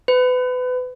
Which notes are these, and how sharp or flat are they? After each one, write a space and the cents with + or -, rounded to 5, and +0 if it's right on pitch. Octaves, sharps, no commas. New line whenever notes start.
B4 +30